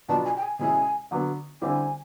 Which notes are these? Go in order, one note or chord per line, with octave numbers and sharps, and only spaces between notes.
B2 F#3 B3 D4 F4 A5
G#5
G5
G#5
B2 G#3 C#4 E4 G#5
D3 F#3 B3
D3 G3 C4 E4 G#5